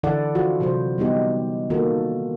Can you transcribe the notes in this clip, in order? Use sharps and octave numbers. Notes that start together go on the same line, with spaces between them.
D3 E3 E4 A4 D5 F#5
F3 F4 F#4
C3 E3 F#3 C5
G3 B3 D#4 G4
D#3 A#3 F4 F#4 A4